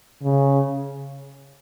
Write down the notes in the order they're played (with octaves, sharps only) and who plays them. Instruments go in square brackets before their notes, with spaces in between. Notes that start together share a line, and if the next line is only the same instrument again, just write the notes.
[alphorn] C#3